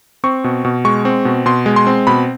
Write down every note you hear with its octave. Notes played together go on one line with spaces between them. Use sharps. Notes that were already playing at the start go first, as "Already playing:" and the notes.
C4 C#6
B2
B2
G#3 C#6
C4
B2
B2 C6
G#3
C6
C4
B2 B5